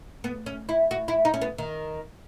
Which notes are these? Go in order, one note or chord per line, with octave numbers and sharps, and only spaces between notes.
B3
C#4
E4
F#4
E4
D#4
C#4
B3
D#3